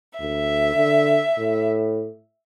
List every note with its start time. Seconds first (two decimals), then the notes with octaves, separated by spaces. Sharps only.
0.20 D2 E5
0.75 D3
1.38 A2